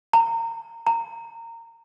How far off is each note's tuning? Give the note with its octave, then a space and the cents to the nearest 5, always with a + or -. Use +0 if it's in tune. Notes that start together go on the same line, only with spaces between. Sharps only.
A#5 -25
A#5 -20